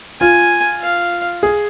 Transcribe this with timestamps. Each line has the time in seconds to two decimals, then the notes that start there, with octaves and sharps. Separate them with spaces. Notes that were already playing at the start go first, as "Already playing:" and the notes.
0.21 F4 G#5
0.81 F5
1.43 G#4